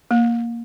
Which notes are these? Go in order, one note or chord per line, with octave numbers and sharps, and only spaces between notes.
A#3